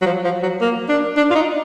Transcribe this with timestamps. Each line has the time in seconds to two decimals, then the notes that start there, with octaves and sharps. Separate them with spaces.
0.02 F#3
0.06 F3
0.24 F3
0.42 F#3
0.61 A#3
0.89 D4
1.17 D4
1.30 F4
1.35 D#4